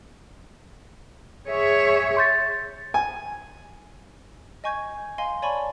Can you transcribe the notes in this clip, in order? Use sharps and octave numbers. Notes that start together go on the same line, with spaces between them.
G#4 C#5 E5
C6 G6 A6
G#5
D#5 G#5 C#6 G6 G#6
D#5 F5 G#5 C6
C#5 D5 G#5 A5 B5 C#6
D#5